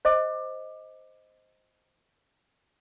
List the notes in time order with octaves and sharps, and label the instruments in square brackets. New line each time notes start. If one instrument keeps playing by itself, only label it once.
[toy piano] C5 D#5 D6